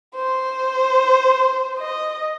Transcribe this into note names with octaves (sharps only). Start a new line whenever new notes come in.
C5
D#5